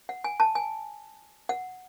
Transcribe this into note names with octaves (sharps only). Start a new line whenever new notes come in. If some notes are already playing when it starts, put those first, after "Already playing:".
F#5
G#5
A5
G#5
F#5